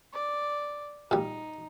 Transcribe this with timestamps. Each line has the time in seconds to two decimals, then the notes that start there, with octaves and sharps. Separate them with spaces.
0.14 D5
1.11 A#2 G3 D#4